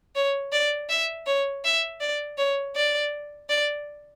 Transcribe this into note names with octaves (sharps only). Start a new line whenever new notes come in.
C#5
D5
E5
C#5
E5
D5
C#5
D5
D5